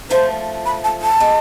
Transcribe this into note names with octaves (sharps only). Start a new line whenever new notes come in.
F3 A3 C5
B5
A5
A5
G#3 B3